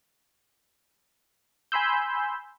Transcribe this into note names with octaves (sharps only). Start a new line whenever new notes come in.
G#5 B5 C6 E6 G6